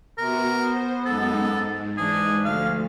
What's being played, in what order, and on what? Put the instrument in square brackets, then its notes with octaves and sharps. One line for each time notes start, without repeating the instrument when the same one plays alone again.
[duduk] C3 [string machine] B3 F#4 [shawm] A#4
[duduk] B3 [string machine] C5
[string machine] F#2 G#3 D#4 [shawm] A4
[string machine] G#2
[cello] E3 G#3 [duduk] D4 [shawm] G#4
[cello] D2 F3 [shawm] F5